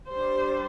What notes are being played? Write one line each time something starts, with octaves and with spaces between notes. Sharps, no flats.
G3 D4 C5